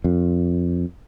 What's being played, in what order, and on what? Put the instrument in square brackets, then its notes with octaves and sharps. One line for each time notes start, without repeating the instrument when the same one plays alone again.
[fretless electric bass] F2